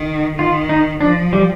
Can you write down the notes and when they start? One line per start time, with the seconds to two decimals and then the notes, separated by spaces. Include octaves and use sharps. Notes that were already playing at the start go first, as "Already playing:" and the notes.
Already playing: D#3
0.39 D#3 F4
0.69 D#4
1.01 F3 D4
1.33 G3